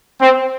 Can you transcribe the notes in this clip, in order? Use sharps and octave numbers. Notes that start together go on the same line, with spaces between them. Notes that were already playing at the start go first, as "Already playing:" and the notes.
C4